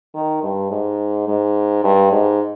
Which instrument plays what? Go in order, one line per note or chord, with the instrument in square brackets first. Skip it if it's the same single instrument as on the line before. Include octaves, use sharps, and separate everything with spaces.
[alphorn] D#3
G2
G#2
G#2
G2
G#2